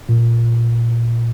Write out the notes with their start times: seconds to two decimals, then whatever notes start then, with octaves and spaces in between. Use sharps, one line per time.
0.09 A#2